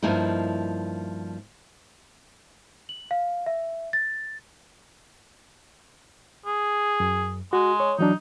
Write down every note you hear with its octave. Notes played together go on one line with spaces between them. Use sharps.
G2 F3 A#3 D#4 E4
F#7
F5
E5
A6
G#4
F#2
G#3 F#4
C#5
E3 F#3 D4 D#4